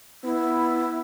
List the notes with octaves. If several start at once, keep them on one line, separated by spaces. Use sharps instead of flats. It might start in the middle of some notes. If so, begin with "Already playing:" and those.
B3 E4